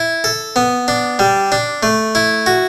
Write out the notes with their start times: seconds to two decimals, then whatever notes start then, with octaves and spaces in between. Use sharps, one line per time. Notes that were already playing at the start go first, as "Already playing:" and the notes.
Already playing: E4
0.24 A4
0.56 B3
0.88 D4
1.19 G3
1.52 D4
1.83 A3
2.15 E4
2.46 F#4